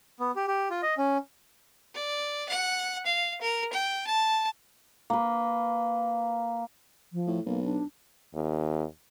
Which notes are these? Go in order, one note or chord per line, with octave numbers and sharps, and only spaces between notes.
B3
G4
G4
F4
D#5
C#4
D5
F#5
F5
A#4
G5
A5
A#3 B4
F3
A2
B1 A#3
D4
D#2